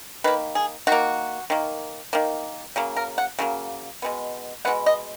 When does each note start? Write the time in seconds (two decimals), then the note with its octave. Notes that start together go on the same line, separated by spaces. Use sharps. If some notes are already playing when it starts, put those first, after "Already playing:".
0.24 D#3 A#3 B4
0.55 G#4
0.87 D#3 A#3 F#4
1.50 D#3 A#3
2.13 D#3 A#3
2.76 C#3 F#3 A#3
2.96 A#4
3.18 F#5
3.39 C#3 F#3 A#3
4.02 B2 G#3 B3
4.65 B2 G#3 B3 F#5
4.86 D#5